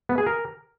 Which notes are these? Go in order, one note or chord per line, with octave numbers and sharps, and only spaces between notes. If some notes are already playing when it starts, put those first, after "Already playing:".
B3
G#4
A#4